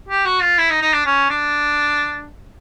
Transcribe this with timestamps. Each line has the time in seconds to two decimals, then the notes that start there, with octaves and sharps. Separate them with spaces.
0.09 G4
0.25 F#4
0.42 F4
0.58 E4
0.70 D#4
0.82 D#4
0.93 D4
1.06 C#4
1.30 D4